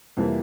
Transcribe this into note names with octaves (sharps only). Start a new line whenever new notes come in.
F2 C3 E3 G3 A#3